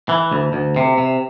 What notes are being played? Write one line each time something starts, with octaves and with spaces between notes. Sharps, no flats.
E3
D2
D2
C3
C3